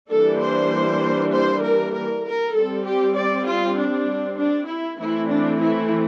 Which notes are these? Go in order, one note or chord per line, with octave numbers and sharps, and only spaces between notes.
E3 G3 A#3 D4 A4
C5
C5
A#4
A#4
A#4
G3 C4 A4
G4
D5
F4
D4
D4
E4
E3 A3 C4 E4
D4
E4